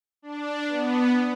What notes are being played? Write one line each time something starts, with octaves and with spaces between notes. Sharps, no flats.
D4
B3